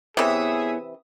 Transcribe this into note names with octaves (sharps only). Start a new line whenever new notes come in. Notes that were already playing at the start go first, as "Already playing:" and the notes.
C3 E3 B3 E4 G#4 C#5 E5 D#6